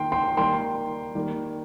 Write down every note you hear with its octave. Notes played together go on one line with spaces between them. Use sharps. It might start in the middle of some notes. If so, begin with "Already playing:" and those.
Already playing: D#3 A#3 G5 C6
G5 C6
D#3 G3 A#3 G5 C6
D#3 G3 A#3